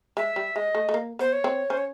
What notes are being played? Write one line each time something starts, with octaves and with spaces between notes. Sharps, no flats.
G#3 E5
G3
G#3 D#5
A3
A3
A#3
B3 C5
C#5
C4
C#4 C5
C#5